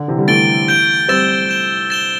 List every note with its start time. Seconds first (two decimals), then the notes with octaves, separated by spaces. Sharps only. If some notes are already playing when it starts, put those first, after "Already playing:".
Already playing: D3
0.08 C3 E3
0.18 D3 G3
0.28 E3 A3 A6 D7 G7
0.68 G6 D7 G7
1.09 G3 C4 E6 A6 E7 G7
1.49 G6 E7 G7
1.90 A6 E7 G7